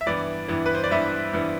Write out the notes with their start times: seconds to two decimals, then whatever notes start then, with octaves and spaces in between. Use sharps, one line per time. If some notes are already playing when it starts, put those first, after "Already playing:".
0.01 E5
0.06 G2 E3 B3 E4 D5
0.48 G2 E3 B3 E4
0.66 B4
0.75 C5
0.84 D5
0.91 G2 E3 B3 E4 E5
1.33 G2 E3 B3 E4